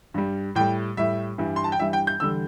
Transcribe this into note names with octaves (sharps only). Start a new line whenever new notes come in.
G2 G3
A2 G3 G5
A2 G3 E5
G2 E3 G3
C6
A5
G5
G2 E3 G3 E5
G5
G6
E2 D3 G3 E6